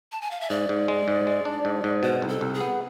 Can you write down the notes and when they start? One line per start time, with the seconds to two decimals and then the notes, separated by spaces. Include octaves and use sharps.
0.12 A5
0.21 G#5
0.31 F5
0.41 E5
0.50 G#2 D5
0.69 G#2
0.88 G#3
1.08 G#2
1.27 G#3
1.45 D4
1.65 G#2
1.84 G#2
2.03 B2 C5
2.22 C2
2.29 A4
2.41 C2
2.54 G#4
2.60 B3